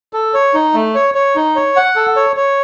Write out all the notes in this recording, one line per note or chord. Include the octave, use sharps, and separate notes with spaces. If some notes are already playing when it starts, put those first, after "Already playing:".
A4
C#5
D#4
A3
C#5
C#5
D#4
C#5
F#5
A4
C#5
C#5